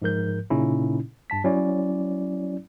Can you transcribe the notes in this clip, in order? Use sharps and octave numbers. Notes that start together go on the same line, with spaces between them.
G#2 F3 A#4 G6
A#2 C#3 C#4 D#4 E4
G2 A5 B6
F#3 C#4 E4 D5